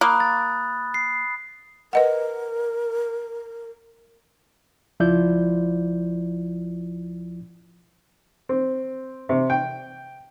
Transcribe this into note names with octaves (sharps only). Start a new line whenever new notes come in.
A#3 B5 D#6 F#6
A6
C7
A#4 B4 D#5 F#5
C#2 F3 E4 F4 D5 G6
C4
C3
G5